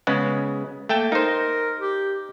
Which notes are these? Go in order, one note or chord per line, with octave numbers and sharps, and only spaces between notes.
C#3 G#3 B3
A3 A#3 G5 A5
D#4 A#4 C5
G4